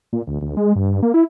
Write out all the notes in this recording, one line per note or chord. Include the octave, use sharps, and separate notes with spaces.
A#2
D2
D2
G#3
G2
A#3
E4